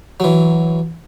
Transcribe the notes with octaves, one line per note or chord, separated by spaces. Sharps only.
E3 F#3